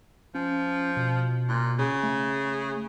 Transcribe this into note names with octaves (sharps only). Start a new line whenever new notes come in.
F3 C#4
B2
A#2
C#3
A3